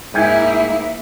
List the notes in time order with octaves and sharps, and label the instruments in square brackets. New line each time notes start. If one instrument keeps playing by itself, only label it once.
[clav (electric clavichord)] G#2 G5 G#5 [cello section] A#3 D#4 E4